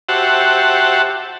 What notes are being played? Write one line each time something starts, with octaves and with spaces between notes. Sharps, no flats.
F#4 G4 C5 E5 F#5 A5